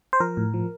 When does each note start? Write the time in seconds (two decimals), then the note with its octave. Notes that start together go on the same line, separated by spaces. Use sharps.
0.13 C5
0.20 F3 A#4
0.37 A2
0.54 F3